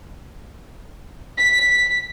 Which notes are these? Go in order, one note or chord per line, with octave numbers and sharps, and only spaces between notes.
B6